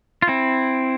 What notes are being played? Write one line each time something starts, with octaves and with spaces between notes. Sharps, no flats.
F4
C4 E4